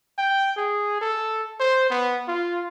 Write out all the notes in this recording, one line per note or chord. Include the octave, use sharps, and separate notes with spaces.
G5
G#4
A4
C5
B3
F4